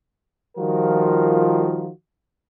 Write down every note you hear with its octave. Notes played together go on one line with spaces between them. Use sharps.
D#3 F3 G3 F4 F#4 A#4